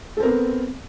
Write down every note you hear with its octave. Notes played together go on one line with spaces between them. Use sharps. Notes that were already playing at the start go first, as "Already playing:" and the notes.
B3 C4 A4 A#4